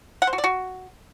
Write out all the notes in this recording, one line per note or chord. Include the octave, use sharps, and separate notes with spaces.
F#5
C5
F#4
D5
F#4